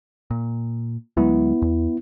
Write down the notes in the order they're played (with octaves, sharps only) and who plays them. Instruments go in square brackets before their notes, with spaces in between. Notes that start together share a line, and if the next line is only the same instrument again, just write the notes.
[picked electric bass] A#2
[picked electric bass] D2 F#3 G#3 [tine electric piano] B3 E4
[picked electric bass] E2